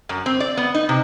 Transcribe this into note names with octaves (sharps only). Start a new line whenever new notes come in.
F#2
C4
D5
B3
D#4
C3